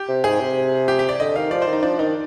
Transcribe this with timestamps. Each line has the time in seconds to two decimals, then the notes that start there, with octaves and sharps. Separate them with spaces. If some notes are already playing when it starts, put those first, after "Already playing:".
Already playing: G4
0.09 C3
0.24 G#2 G#4
0.40 C3
0.88 G4
0.99 G4
1.09 D5
1.20 D3 D#5
1.36 D#3 F5
1.51 F3 D5
1.62 C5
1.67 D#3
1.73 D#4
1.83 F3 D4
1.99 D#3 D#4